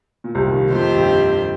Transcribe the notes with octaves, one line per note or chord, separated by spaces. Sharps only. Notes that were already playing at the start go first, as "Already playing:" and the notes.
A#2
C2 C3
D#2 D#3
D#2 D#3
F2 D#3 F3 A3 C4 G4 C5
G2 G3